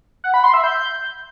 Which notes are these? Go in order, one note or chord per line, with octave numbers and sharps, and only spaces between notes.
F#5
B5
C6
E5
G6